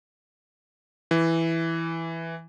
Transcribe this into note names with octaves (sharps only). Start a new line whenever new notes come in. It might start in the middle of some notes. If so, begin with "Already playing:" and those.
E3